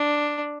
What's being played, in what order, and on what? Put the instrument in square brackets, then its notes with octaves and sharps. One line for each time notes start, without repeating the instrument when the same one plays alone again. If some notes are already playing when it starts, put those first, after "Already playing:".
Already playing: [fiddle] D4